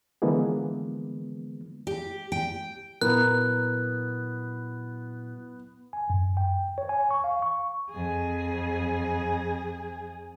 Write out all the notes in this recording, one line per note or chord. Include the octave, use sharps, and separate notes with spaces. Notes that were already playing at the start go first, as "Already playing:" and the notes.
D3 E3 F3 G#3 A#3 B3
G4
G5
A#2 F#3 B3 E4 A#4 F#6
G#5
F#2
G5
C#5
G#5
C#6
F5
C#6
F2 G#4